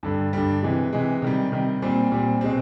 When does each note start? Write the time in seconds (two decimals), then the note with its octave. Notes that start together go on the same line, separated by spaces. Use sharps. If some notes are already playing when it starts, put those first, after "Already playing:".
0.03 G2 D3 G3
0.33 G2 D3 G3
0.63 C3 E3 G#3
0.93 C3 E3 G#3
1.22 C3 D#3 G3
1.52 C3 D#3 G3
1.82 A#2 G3 C4
2.12 A#2 G3 C4
2.41 B2 G#3 C4